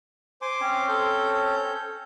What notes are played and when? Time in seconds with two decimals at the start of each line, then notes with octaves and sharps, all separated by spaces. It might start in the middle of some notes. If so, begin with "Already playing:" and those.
0.42 C5 G#5 C6 D6
0.61 C4 C#4 C#5
0.88 A4 G6